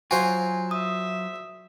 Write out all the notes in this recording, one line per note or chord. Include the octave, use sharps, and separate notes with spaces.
F#3 F4 F#4 C5 G#5
E5 D#6